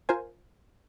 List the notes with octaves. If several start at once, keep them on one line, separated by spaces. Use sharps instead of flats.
F4 A#4 C5 G#5